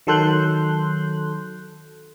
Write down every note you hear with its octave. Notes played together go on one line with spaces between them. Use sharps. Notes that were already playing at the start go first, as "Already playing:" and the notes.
D#3 F#3 A4 C6 F#6 G6